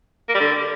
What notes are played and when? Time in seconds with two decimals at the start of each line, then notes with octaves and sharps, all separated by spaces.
0.29 A#3
0.34 G3
0.40 D3